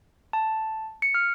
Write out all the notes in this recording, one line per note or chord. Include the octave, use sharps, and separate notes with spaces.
A5
C#7
F6